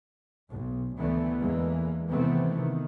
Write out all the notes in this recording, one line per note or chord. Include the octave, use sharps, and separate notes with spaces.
B1
D2 D3 E3 A3 B3
E2 D3 E3 G#3 A#3
C3 D#3 E3 A3 B3 C4
C3 D#3